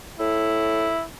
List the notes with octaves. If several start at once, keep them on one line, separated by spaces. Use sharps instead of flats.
A2 E4